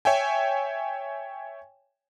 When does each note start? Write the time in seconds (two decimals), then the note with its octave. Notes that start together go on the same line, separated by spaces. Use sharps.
0.05 C#5 E5 G5 G#5